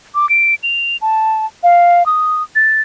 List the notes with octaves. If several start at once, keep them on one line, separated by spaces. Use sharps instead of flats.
D6
D7
F7
A5
F5
D#6
A6